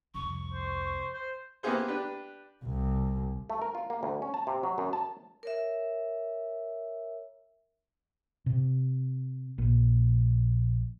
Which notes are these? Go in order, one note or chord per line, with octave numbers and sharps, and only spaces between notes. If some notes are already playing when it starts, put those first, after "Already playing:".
C2 F2 C#6
C5
C5
A#3 B3 E4 G4 G#4 C5
D4 G4 B4
C2
A3
A#4
F4
A#3
D2
C#4
A5
C3
F#3
F#2
A5
A#4 C#5 E5
C3
A#1